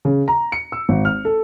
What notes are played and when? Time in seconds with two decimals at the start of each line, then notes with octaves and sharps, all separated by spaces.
0.05 C#3
0.28 A#5
0.52 C#7
0.72 E6
0.89 G#1
1.05 F6
1.25 A4